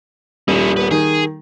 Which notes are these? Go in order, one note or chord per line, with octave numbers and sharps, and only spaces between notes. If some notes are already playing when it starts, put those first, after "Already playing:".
D#1 C#4 E4
B3 B4
D#3 G#4